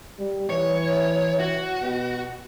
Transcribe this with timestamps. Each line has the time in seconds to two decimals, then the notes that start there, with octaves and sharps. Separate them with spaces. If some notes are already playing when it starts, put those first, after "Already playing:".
0.18 G3
0.50 E3 C#5
1.39 F#4
1.81 B2